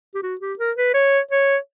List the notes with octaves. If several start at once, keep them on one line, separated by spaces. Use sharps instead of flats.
G4
F#4
G4
A#4
B4
C#5
C#5